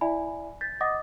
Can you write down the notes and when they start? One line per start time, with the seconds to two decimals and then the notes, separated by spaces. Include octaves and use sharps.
0.01 E4 D5 E5 G#5 B5
0.61 G6 A6 B6
0.81 D#5 F#5 D6 D#6 A6 A#6